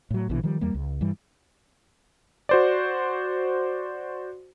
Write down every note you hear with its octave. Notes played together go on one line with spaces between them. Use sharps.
A2 F#3
A#1 B2 D3 E3
D#3 F3 G3
E2 G3 A#3
C#2
G2 E3 G3
F#4 C5 D5